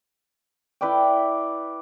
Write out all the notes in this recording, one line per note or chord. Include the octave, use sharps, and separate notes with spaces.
E4 B4 D5 G5